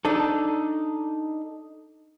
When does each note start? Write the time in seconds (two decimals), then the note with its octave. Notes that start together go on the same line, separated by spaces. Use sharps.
0.05 D4 D#4 A4